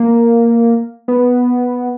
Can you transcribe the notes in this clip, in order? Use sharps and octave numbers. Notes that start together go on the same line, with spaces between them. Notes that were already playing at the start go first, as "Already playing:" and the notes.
Already playing: A#3
B3